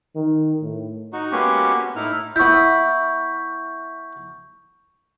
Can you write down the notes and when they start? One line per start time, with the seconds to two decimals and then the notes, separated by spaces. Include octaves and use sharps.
0.16 D#3
0.62 A2
1.13 D#4 F#4
1.32 G#3 A#3 B3 C#4 F#4 G4
1.96 A2 D#4 E4 F6
2.36 B3 E4 C#6 G6